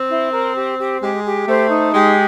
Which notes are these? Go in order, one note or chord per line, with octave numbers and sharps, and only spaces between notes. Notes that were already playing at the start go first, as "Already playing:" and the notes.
Already playing: C4
E4
A#4
G4
G4
G#3 G4
G4
A3 C5
D#4
G#3 G4